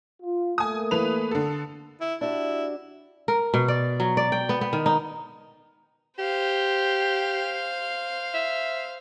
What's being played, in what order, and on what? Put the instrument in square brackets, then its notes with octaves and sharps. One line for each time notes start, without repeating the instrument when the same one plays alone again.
[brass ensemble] F4
[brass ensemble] A3 A#3 [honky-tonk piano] G#5 D#6
[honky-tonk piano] E3 B4 F7
D3 A4
[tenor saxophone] E4
[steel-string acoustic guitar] D4 F#4 G4 [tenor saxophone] E4
[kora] A#4
B2
D5
F#3
D5
G5
B3
B3
D#3
D#4
[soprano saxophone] G4 [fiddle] C5 F5
[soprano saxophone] E5